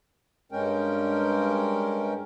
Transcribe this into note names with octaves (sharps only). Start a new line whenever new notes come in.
G2 G#3 C#4 A#4 G5